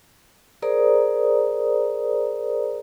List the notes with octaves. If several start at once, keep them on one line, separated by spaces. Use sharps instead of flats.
G#4 A#4 C5 D5 A#5 D#6